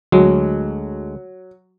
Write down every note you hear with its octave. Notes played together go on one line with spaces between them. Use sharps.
D2 F#3 G#3